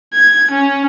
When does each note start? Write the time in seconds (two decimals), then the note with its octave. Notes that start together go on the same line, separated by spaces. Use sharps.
0.13 G#6
0.51 C#4